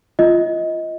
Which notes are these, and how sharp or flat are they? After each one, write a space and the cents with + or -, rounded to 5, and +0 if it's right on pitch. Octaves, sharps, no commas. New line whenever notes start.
F4 -15 D#5 +20